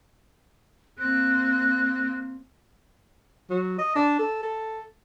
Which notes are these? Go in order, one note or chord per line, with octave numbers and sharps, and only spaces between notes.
A#3 C4 F#6
F#3
D#5
D4
A4
A4